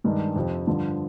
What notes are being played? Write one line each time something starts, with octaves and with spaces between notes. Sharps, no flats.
G2 D#3 G#3 D4
F2 C3 F3 C4
G2 D3 F3